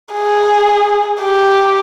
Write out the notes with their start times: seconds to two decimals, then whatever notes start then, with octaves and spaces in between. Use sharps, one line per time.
0.14 G#4
1.22 G4